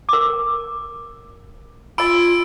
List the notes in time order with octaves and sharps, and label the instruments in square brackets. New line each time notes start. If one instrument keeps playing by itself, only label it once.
[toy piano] A#4 D6
[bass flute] F4 [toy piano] D#5 B5 [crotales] E6 D7